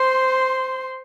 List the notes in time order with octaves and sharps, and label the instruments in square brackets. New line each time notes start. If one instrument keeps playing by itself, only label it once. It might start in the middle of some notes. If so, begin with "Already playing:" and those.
Already playing: [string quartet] C5 C6